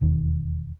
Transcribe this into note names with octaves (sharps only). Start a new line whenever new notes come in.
E1 D#2 D#3